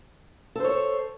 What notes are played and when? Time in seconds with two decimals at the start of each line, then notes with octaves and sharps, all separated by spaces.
0.56 A4
0.60 C5
0.65 C#5